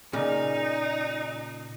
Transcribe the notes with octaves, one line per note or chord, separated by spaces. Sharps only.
A#2 C#3 D#4